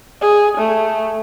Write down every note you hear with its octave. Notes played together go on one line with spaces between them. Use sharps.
G#4
A3